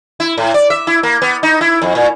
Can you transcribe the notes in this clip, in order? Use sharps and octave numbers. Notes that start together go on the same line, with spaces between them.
E4
A2
D5
E5
E4
A#3
B3
D#4
E4
F2
A#2